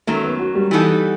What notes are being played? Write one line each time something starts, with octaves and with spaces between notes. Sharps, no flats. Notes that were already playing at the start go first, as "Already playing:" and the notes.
F#2 D#3 F#3 A3
B3
F#4
G3
E3 B3 D#4 F#4 A4